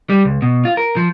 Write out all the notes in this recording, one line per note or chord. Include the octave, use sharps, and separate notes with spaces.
G3
C#2
B2
F4
A#4
F3